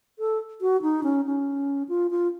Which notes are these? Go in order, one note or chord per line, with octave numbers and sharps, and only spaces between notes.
A4
F#4
D#4
C#4
C#4
F4
F4